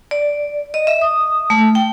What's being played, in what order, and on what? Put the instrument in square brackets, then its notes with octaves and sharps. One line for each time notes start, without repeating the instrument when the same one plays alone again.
[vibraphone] D5
D#5
E5
D#6
A3
G5